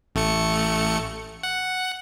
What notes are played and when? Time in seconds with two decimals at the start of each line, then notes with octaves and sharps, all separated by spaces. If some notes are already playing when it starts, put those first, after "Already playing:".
0.15 A1 A3 C#7
1.43 F#5